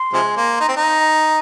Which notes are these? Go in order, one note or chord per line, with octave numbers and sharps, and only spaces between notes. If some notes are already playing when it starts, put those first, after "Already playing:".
Already playing: C6
C3 F3 G#3
A#3
D#4
C4
D#4